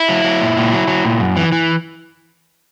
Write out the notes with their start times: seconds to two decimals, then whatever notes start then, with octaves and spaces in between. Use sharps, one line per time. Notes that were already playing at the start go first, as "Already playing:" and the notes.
Already playing: E4
0.09 F#3
0.24 F#3
0.41 A#2
0.57 A#2
0.73 F#3
0.88 F#3
1.05 A#2
1.20 F#2
1.37 E3
1.52 E3